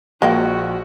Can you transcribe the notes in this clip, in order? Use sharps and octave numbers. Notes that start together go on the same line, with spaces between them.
A#1 F3 G#3 A#3 F#4 G5 C#6